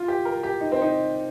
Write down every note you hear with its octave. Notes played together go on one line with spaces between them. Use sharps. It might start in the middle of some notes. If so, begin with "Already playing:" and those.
Already playing: F4
G4
A#4
G4
D#4
C4
D#4